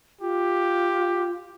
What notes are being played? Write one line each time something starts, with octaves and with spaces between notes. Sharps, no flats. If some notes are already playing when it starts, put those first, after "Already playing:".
F4 G4